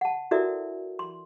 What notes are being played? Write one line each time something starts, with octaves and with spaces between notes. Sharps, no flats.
F#5 A5
E4 F#4 A4 A#4 D5 E5
C6